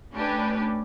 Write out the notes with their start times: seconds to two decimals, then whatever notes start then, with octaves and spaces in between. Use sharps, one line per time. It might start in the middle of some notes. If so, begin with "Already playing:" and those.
0.13 A3 C#4 D4 G4 B4